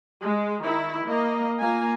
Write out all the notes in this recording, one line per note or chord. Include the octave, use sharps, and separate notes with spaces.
G#3
D#3 E4
A#3 D#5
A#3 F4 G#5